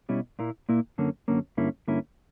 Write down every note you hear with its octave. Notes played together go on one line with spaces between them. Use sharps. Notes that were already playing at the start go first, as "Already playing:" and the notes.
B2 G3 C#4 E4
A#2 A#3 E4
A#2 A#3 E4
F#2 D3 A#3 C#4
F#2 D3 A#3 C#4
G2 D3 A#3 C#4 E4
G2 D3 A#3 C#4 E4